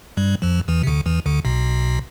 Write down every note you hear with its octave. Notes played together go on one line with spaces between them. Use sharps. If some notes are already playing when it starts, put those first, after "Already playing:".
G2 G3
F2 F3
E2 E3
C3
D2 D3
E2 E3
D2 D3
B1 B2